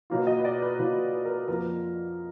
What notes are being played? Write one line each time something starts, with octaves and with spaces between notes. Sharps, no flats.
B2 F#3 A#3 F4
D#5
B4
D5
B4
B2 F#3 A#3 F4 B4
B4
A#4
F2 F3 A#3 F4 A#4